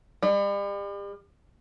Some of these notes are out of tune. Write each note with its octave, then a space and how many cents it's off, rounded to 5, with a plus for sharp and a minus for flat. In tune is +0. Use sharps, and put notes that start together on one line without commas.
G3 +40